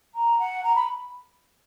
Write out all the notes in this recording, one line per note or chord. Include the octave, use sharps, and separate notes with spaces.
A#5
F#5
A#5
B5